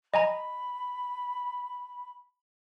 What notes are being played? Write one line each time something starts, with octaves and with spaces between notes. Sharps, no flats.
D#5 G#5 A#5 B5